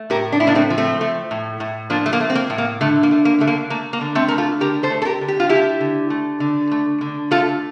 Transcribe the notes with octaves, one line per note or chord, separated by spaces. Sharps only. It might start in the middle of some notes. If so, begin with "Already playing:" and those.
Already playing: A3
A2 G4 A#4
D4
A2 E4
A#3 D4
A3 C4
F3
A3 C4
A3
A2
A2
F3 A#3 D4
A3
A#3
A3
C4
A#3
A2
A#3
D3 A3
A#3
A3
A#3
D3 A3
A#3
A3 A#3
A#3
D3
A3 C4
A3 A#4
F4 A4
D3 G4 A#4
A4 C5
A3
A4
G4 A#4
D3
G4
F4
A3 E4 G4
D3
A3
D3
A3
D3
A3 F4 A4